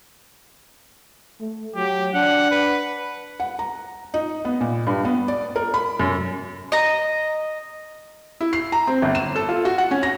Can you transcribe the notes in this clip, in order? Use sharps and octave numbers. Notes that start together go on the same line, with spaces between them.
A3
F#3 G4
D4 F#5
B4
F#5
A#5
D#4
B3
A#2
G2
B3
D5
A#4
B5
F#2
D#5 A#5
E4
C7
A#5
C4
G1
E7
A4
F4
F#4
F#5
C#4
A#6